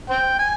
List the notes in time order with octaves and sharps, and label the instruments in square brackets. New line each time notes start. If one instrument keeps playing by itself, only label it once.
[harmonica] C5 G5
G#5